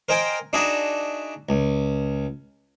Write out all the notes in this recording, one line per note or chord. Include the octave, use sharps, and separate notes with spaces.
A#4 C5 D#5 G5 G#5
D4 D#4 F#4 G#4 E5
C#2